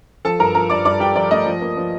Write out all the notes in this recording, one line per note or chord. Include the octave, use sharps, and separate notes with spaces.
F3 A4 A5
G2 A#4 A#5
F3 A#4 A#5
G2 D5 D6
G2 D5 D6
G2 G4 G5
F3 D5
A3 D#5
F3
A#3
F3